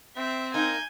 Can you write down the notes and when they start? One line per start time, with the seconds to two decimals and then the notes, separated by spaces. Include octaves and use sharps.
0.17 C4 E5
0.54 A#3 D#4 G#5 G6